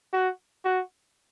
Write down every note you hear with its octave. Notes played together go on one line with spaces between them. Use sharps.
F#4
F#4